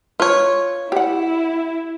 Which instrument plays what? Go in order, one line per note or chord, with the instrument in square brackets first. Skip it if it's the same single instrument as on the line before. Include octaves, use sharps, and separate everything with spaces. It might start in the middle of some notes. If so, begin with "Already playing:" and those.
[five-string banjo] F4 C#5 [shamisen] B4
[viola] E4 [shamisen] G4 F#5